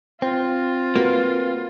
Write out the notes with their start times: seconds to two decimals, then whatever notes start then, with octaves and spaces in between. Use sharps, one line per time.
0.22 C4 F4
0.96 A#3 F#4 B4